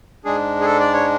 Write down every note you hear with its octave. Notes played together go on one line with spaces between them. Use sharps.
G#2 G#3 D4 G#4
G#4
A4
D5
C#5